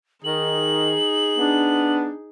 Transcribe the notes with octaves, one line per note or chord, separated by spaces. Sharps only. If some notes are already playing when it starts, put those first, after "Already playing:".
D#3 D#4 G#4 F#7
B3 D4